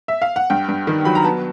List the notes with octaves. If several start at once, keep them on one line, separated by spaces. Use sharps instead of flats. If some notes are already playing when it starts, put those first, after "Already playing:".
E5
F5
F#5
G2 G5
G2
D#3
F#3 B5
A#5
B3 A5